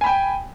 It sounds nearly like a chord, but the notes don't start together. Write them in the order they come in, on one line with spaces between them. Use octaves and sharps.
G#5 B5 G5